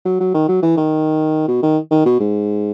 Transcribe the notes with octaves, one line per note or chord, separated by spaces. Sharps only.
F#3
F#3
D#3
F#3
E3
D#3
B2
D#3
D#3
B2
G#2